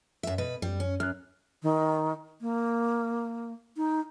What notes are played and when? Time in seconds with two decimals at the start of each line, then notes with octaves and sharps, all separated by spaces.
0.23 F#2 E5
0.38 B2 B4
0.62 F#2 G3
0.80 C#4
1.00 F#2 F6 F#6
1.63 D#3
2.41 A#3
3.77 D#4